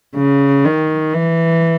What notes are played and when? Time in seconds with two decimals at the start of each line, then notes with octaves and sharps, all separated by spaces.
0.16 C#3
0.65 D#3
1.13 E3